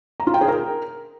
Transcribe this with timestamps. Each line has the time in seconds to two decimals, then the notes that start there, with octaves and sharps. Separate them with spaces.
0.20 A#5
0.27 F4
0.34 G5
0.41 G#4
0.48 A#4